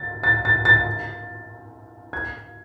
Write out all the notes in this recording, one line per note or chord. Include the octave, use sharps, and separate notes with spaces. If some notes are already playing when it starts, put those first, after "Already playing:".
Already playing: A6
A6
A6
A6
G#6